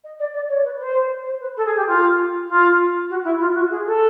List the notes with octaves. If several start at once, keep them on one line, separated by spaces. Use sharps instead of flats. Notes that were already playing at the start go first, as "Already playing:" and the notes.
D#5
D5
D5
C#5
B4
C5
C5
B4
A4
G#4
G4
F4
F4
F#4
E4
F4
F#4
G#4
A4